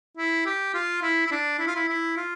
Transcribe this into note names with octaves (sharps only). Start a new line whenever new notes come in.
E4
G4
F4
E4
E4
D4
E4
F4
E4
E4
F4